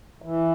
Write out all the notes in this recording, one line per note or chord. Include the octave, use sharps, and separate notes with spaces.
E3